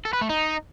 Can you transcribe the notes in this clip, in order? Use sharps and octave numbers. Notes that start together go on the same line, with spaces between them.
A4
B4
A3
D#4